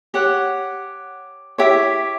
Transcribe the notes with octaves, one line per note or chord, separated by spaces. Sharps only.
G4 C#5 F#5
E4 G4 C#5 E5